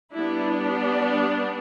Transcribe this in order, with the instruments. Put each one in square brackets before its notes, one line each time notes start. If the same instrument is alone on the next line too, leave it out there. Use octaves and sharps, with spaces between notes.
[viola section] G3 B3 D4 E4